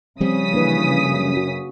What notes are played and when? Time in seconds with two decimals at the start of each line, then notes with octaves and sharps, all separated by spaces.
0.20 C#3 F3 G3 C4 D#6 B6
0.53 E3 A#3 D4 B4
1.04 F#2
1.37 F#4